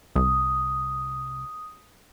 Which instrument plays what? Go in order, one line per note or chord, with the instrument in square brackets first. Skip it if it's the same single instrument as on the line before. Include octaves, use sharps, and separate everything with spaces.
[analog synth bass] C2 [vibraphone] D#6